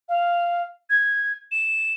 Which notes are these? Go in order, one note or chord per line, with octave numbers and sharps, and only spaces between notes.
F5
G#6
E7